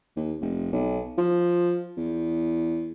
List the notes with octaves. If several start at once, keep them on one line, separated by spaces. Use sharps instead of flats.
D#2
F1
B1
F3
E2